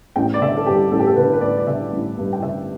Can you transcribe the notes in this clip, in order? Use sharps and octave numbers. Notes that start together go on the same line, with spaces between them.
A1 G5
D5
D3 E5
A4
G2 G4
A1 A4
G4
A4
D3 B4
B4
A1 D5
D5
D3 E5
A1
G2
G5
D3 E5